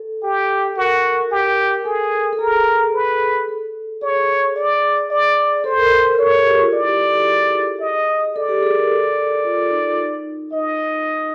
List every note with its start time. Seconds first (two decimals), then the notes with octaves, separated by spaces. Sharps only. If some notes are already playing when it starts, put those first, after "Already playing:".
Already playing: A4
0.23 G4
0.77 F#4 A#4
1.31 G4
1.85 G#4 A4
2.33 A4
2.39 G#4 A#4
2.94 B4
3.48 A4
4.02 G#4 C#5
4.56 D5
5.11 D5
5.64 A4 C5
5.78 A#4
5.92 A#4
6.05 A#4
6.18 A4 C#5
6.32 G#4
6.46 G4
6.60 F4
6.73 E4 D5
6.86 G4
7.01 A4
7.14 G#4
7.81 D#5
8.36 A4 D5
8.49 G4
8.63 G#4
8.76 A#4
8.90 A4
9.44 F4
9.71 D#4
9.98 D#4
10.52 D#4 D#5